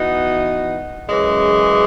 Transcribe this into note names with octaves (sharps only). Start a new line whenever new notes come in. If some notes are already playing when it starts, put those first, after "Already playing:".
Already playing: E3 B3 D#4 F#4
F#2 C#3 E3 G#3